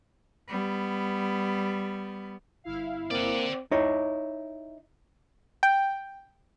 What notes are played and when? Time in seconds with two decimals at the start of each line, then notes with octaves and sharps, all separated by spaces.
0.49 G3 B3
2.64 G1 E4 F5
3.11 A#3 C4 D5 F#5
3.71 D#4 E4 C#5
5.63 G5